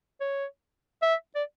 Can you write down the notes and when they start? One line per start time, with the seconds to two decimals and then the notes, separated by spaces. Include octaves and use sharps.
0.21 C#5
1.02 E5
1.35 D5